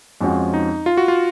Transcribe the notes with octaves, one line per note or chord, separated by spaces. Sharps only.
F2 F3 G#3 C#4 F#4
D#4
F4
F#4
F4